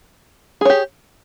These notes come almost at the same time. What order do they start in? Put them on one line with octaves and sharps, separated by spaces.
G#4 C#5 G4